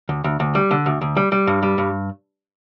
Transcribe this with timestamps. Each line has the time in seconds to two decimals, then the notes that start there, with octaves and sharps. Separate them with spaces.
0.09 D2
0.24 D2
0.40 D2
0.55 G3
0.71 D3
0.86 D2
1.01 D2
1.16 G3
1.32 G3
1.47 G2
1.63 G3
1.78 G2